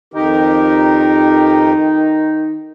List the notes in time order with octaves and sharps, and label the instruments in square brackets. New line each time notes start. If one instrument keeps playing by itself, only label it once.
[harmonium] F2 G4 A#4 [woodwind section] D#3 D#4